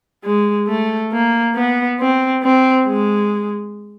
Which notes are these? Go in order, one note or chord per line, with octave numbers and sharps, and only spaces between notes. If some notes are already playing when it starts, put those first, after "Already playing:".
G#3
A3
A#3
B3
C4
C4
G#3